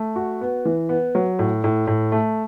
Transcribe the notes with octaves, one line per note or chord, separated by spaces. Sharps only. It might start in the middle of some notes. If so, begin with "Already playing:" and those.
Already playing: A3
F#4
B3
E3
B3
F#3
A2
A2
A2
A3